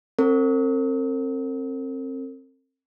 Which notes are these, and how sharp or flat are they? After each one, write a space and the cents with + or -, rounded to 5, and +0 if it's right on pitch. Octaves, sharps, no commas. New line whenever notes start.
C4 +30 A#4 -45